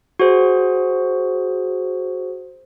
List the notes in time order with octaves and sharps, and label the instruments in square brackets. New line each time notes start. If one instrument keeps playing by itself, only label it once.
[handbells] F#4 G#4 C5